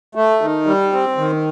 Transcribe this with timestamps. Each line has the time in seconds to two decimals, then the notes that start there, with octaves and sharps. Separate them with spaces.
0.15 A3
0.41 D#3
0.66 G3
0.93 C4
1.17 D#3